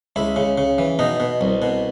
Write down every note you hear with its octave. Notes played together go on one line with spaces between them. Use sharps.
C#2 E4
C#3
C#3
E3
B2 D#4
B2
C2
B2